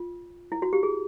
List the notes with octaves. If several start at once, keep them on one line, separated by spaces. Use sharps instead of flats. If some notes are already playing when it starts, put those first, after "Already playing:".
Already playing: F4
E4
F#4
G4
G#4